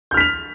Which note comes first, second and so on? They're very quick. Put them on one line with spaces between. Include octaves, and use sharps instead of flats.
G6 F6 B6 F7